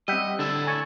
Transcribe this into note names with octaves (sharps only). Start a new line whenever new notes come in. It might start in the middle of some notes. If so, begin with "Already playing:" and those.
G3 C4 D#5 E5 F#5 G5
D3 D4 E4 A4
C#5 G#5 A5